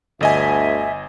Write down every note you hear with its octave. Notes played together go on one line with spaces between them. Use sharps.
G1 D2 D#5 E5 G#5